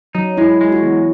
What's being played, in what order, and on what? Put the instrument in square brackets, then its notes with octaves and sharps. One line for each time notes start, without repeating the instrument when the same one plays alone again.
[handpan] F#3 [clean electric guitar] D#4
[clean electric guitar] G#3 [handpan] E4
[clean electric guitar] G#3
[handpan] F#4
[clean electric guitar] E2